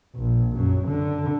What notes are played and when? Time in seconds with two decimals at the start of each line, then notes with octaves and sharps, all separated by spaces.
0.15 A#1
0.57 F#2
0.87 D3